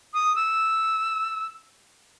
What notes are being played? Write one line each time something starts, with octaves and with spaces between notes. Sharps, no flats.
D#6
E6